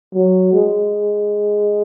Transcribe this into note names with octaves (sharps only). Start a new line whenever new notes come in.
F#3
G#3